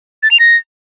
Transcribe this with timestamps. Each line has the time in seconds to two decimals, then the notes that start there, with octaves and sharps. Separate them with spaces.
0.23 A6
0.31 F7
0.40 A#6